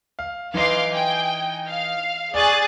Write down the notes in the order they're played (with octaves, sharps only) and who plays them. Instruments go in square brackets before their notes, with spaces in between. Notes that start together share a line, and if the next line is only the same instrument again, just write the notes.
[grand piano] F5
[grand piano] E3 D#4 [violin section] F5 C6 D6
[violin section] G5 G#5
F5
[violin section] G#4 F#6 A6 [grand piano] D5 C#6